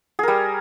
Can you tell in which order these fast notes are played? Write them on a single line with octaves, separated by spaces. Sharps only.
G#4 A#4 G3